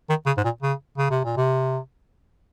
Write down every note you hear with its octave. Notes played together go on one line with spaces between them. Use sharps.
D#3
C#3
G#2
A#2
C#3
C#3
C3
A#2
C3